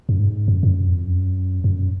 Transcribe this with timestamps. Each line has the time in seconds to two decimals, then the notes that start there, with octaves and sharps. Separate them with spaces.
0.09 F#2
0.19 G#2
0.48 F#2
0.63 G#2
0.68 F#2
0.87 F2
1.06 F#2
1.64 F#2